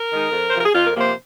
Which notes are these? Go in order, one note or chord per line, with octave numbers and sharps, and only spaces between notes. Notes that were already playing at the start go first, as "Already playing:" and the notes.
Already playing: A#4
D#3 G#3 D#4
F2
C5
C3 F3 A#4
G#4
F2 F4
A#4
C3 F3 A#3
C5